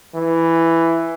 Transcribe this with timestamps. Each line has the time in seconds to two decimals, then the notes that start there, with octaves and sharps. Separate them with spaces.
0.14 E3